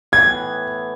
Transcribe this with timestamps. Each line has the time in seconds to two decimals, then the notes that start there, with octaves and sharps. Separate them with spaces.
0.12 A2 E3 B3 G#6